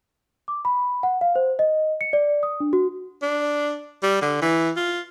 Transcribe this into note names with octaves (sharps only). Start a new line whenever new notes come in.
D6
B5
F#5
F5
C5
D#5
C#7
D5
D#6
D4
F#4
D4
G3
D3
E3
F4